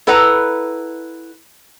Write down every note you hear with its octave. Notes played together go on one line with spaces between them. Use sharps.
E4 A4 B4 F#5 A#5